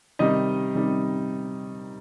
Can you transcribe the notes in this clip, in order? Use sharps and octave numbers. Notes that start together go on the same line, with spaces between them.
C3 D#3 G3 D#4 D#5
C3 D#3 G3